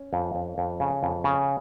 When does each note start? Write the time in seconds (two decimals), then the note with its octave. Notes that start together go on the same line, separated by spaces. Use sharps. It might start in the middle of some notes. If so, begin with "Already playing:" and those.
Already playing: C#4
0.13 F2
0.35 F2
0.58 F2
0.80 C#3
1.03 F2
1.24 C#3